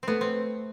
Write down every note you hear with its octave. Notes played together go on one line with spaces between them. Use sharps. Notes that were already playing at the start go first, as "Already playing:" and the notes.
A3 B3 C4
C4